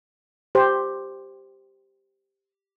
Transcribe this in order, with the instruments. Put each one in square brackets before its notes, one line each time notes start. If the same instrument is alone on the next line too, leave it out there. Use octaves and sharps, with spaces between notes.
[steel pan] G4 C5